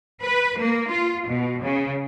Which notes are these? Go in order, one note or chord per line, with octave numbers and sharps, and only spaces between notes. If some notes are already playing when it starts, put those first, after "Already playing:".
B4
A#3
F4
B2
C#3